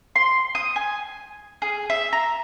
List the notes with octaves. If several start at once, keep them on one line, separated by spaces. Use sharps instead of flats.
C6
D#6
G#5
G#4
E5
A#5